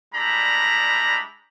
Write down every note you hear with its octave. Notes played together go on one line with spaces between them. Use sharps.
G3 G#3 D4 E4 A#5 B5